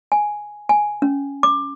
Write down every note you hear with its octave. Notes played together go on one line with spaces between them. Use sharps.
G#5
G#5
C#4
D6